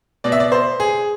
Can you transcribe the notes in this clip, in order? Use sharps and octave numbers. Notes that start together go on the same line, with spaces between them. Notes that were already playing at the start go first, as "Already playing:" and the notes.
B2 D5
E5
D5
C5
G#4